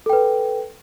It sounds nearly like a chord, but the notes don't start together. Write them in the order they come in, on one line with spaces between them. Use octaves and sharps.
A4 G5 B4